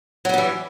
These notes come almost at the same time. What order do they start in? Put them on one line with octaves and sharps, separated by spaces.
F#3 G3 B3 E3